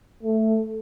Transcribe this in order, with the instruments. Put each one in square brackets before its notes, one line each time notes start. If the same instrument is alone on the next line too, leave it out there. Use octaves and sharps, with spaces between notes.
[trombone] A3